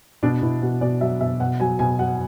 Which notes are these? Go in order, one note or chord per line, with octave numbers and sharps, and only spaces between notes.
B2 D4
B2 E4
B2 F#4
B2 D5
F#3 E5
B2 E5
B2 F#5
F#3 G#5
B2 G#5
F#3 F#5